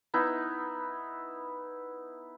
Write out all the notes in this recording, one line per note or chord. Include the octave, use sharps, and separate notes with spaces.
B3 D#4 E4